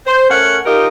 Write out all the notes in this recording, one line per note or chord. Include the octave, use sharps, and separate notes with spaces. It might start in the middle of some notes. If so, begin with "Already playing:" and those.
C5
A3 C#4 A#4 C#5 F#5
D#4 F4 G4 A#4 D#5